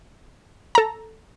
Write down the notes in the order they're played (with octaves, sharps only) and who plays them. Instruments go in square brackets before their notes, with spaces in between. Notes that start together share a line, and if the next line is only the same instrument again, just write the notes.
[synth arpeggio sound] A4 A#5